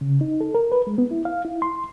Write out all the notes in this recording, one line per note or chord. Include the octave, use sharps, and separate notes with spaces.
C#3
D#4
A4
A#4
B4
G#3
B3
E4
F5
E4
C6